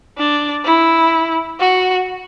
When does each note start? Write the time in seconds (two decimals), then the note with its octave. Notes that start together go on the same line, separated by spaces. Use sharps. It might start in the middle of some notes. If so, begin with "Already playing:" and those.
0.18 D4
0.65 E4
1.60 F#4